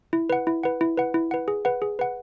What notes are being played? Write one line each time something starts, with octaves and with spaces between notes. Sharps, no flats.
E4
B4 F#5
E4
B4 F#5
E4
B4 F#5
E4
B4 F#5
G#4
B4 F#5
G#4
B4 F#5